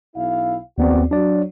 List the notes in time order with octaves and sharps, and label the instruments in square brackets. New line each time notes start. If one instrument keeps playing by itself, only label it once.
[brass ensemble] B1 E4 F5
[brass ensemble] A1 F#4 D5 [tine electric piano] D#2 B3 C4
[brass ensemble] F#3 [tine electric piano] D4 D5